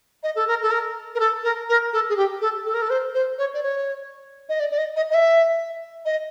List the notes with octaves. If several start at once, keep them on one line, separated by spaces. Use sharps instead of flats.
D#5
A4
A#4
A4
A#4
A#4
A4
A#4
A#4
A4
G#4
G4
A4
A4
A#4
A4
C5
C5
C#5
D5
C#5
D#5
D5
D5
D#5
D#5
D#5
E5
D#5